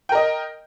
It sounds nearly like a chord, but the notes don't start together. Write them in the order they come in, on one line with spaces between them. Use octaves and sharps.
G5 A#4 D#5